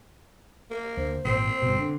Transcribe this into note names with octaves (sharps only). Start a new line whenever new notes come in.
A#3
D2 C5
G#1 A#2 C4
G1 B2
D3